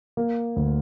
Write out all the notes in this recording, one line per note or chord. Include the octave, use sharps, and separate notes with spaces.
A#3
D2